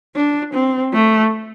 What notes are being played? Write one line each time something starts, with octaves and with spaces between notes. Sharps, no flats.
D4
C4
A3